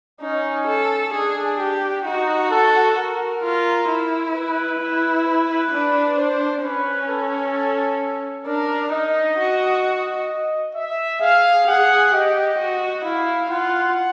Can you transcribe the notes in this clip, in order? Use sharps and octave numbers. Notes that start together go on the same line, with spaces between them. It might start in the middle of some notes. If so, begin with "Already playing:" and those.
C#4 D#4
A4
D4 G#4
G4
D#4 F#4
A4
A#4
F4
E4
B4
E4
B4
D4
C5
C#4 B4
A4
D4 A#4
D#4 D#5
F#4
D#5
E5
G#4 F5
G#4 F#5
G4 D#5
F#4
E4 F5
F4 F#5